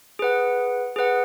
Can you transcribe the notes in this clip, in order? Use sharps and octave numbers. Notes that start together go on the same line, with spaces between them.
G#4 B4 F#5
G#4 B4 F#5